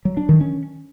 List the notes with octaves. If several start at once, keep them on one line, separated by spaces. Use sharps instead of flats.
F#3
D4
D#3
C#4